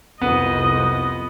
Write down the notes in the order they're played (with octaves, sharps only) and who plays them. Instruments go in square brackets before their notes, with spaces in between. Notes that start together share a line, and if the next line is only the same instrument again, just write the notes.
[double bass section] C2 F2 [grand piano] B3 [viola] D#5